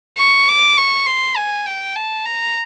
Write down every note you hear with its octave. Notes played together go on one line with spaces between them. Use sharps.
C#6
D6
C#6
C6
G#5
G5
A5
A#5